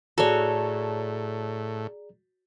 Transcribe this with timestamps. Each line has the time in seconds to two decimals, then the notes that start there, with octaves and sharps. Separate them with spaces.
0.18 A2 F#4 G#4 A4 C#5 D5 A#5